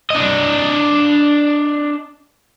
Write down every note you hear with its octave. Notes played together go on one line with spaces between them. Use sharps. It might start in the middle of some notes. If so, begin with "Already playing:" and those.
D4 D#5